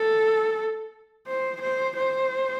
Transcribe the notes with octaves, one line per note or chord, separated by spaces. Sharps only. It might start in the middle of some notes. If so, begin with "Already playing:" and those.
Already playing: A4
C5
C5
C5